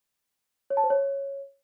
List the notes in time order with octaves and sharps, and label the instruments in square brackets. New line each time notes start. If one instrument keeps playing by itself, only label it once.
[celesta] C#5
A5
C5
C#5